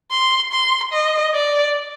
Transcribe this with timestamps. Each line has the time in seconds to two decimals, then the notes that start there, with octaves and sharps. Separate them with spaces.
0.11 C6
0.52 C6
0.93 D#5
1.34 D5